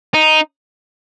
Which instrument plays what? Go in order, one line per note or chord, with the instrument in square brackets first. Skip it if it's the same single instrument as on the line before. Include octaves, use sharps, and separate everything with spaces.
[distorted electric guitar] D#4